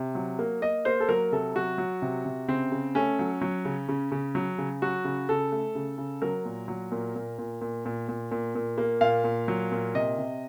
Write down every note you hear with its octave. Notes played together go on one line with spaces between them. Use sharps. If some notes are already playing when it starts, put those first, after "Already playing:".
Already playing: C3
F#3
A#3
A#3 D#5
A#3 C5
A4
F#3 A#4
C3 A4
F#3 F#4
F#3
C3
C3
C#3 C4
C#3
A3 C#4
F#3
F#3
C#3
C#3
C#3
F#3
C#3
F#3 F#4
C#3
C#3 A4
A3
C#3
C#3
F#3 A#4
A#2
F#3
A#2
A#2
A#2
A#2
A#2
A#2
A#2
A#2
A#3
A#2 F5
A#2
F#3
A#2
C3 D#5
C3